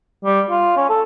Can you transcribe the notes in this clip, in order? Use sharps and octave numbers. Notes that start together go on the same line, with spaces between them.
G3
F4
C#4
A4